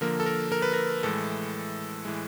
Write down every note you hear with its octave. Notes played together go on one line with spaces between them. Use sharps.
D3 F3 A#3 A#4
A4
A#4
A#4
B4
A#4
A2 E3 G#3 A4
A2 E3 G#3